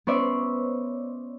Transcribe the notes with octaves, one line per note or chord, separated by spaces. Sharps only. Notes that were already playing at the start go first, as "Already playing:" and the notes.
B3 C#4 C5 D5 E5